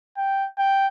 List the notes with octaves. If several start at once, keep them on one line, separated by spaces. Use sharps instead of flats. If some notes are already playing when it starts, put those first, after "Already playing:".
G5
G5